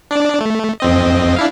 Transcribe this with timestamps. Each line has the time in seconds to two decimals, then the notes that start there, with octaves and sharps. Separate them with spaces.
0.11 D4 D5
0.41 A3
0.80 F2 C4 D#5
1.36 D4 E4 F5